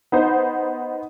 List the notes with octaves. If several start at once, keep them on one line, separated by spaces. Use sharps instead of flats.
B3 D#4 C5